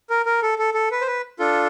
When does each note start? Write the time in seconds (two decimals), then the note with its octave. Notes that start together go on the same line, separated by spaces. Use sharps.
0.10 A#4
0.26 A#4
0.42 A4
0.58 A4
0.74 A4
0.91 B4
1.01 C5
1.07 B4
1.39 D4 F4 A4